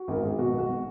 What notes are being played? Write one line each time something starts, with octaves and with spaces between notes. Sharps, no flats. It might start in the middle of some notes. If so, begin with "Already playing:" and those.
Already playing: F#4
G#1 A#4
G#1 G#4
B2 F#4
B1
F#4